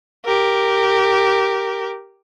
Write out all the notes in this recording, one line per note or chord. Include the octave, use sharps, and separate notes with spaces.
G4 A#4